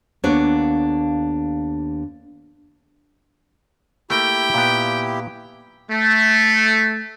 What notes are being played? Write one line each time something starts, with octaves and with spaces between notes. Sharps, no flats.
D#2 A#3 B3 D4 A4 C#5
A3 A#3 E4 G4 G5
A#2 B3
A3